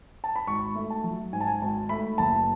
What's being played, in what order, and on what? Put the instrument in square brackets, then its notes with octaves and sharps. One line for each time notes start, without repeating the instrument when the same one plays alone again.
[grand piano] A5
B5
G#1 C#6
A3
A5
F#3
G#2 G#5
A5
G#5
G#1 A5
A3 B5
F#1 A5